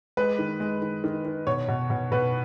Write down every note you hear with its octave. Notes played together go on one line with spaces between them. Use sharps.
G#3 B4
D#3
G#3
D#3
D#3
D#3
B2 C#5
B2
B2
B2 B4